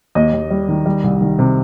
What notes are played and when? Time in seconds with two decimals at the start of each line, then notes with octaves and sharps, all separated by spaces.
0.15 D#2 D#5
0.33 D#2
0.50 G3
0.68 D#3
0.86 G3
1.04 C2
1.21 D#3
1.39 C3